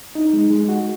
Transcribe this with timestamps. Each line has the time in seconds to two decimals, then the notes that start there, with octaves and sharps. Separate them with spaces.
0.15 D#4
0.33 G#3
0.50 G#3
0.69 F#4